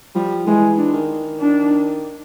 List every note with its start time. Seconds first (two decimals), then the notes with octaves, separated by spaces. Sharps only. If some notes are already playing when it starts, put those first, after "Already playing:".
0.15 F3 G3
0.47 E3 G#3
0.77 D4
0.93 D#3
1.40 D4